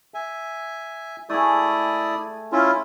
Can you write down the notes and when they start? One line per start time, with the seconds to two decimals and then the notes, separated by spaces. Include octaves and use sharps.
0.14 E5 G#5
1.29 A3 E4 G#4 D5 D#6
2.52 C#4 E4 F4